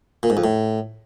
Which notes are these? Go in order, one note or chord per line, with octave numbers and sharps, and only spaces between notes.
A#2
G#2
F2
A2